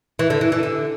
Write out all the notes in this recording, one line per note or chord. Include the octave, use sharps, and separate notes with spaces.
E3
D3
E3
E3
D3